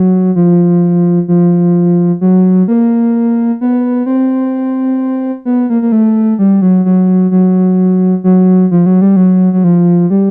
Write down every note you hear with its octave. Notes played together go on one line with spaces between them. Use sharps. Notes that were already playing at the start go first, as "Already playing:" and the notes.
Already playing: F#3
F3
F3
F#3
A#3
B3
C4
B3
A#3
A#3
A3
G3
F#3
F#3
F#3
F#3
F3
F#3
G3
F#3
F#3
F3
G3